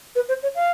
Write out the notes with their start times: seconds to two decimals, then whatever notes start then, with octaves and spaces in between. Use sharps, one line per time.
0.16 B4
0.29 C5
0.43 C#5
0.55 F5